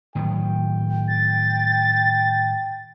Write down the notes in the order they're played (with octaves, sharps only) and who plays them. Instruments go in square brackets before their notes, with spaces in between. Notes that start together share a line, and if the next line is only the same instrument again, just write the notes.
[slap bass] A2 D#3 F#3 [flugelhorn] G5
[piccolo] A6